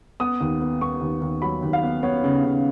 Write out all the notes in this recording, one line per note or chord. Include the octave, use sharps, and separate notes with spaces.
B3 D#6
D#2
B3
B3 C#6
D#2
D#2
F#3 B5
D#2
F5
B3
B3 C#5
C#3
C#3